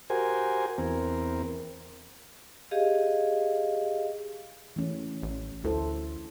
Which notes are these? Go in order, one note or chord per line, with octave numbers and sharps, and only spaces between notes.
F#4 G4 A#4 C5 G#5
E2 C4 A#4
G4 G#4 D#5 F5
E3 A3 C#4
A1
D2 E4 A4 C5